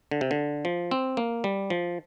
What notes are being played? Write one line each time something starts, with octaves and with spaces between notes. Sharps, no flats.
D3
C3
D3
F3
C4
A#3
G3
F3